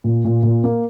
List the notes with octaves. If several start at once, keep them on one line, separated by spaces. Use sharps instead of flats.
A#2
A#2
A#2
A#3